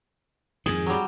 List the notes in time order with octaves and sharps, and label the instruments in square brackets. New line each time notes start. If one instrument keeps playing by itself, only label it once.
[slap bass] F2 G#2 D#3 [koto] G#4
[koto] F#3 G3